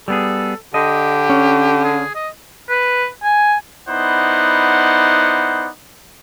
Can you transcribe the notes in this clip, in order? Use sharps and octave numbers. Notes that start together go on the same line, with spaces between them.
G3 B3 G#4 A4
D3 G4 D#5
C#4
G#4
D#5
B4
G#5
B3 D#4 E4 C5 D5 F#5